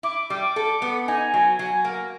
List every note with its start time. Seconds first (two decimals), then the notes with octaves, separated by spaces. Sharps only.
0.03 E4 D6
0.30 G3 D6
0.56 A4
0.82 B3
1.08 D#4 G#5
1.34 F#3
1.59 F#3
1.85 A#3